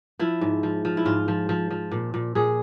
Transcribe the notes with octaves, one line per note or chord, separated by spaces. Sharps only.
F3 E4
G#2
F3
F3
E4
G#2 F4
F3
F3
F3
A#2
A#2
A#2 G#4